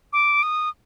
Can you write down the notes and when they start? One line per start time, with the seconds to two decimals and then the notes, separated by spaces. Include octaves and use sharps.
0.13 D6
0.43 D#6